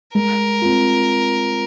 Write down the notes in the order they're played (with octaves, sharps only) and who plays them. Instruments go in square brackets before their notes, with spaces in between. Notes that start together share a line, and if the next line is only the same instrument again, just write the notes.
[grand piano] G#3 [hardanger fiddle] A#4
[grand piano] C4 F4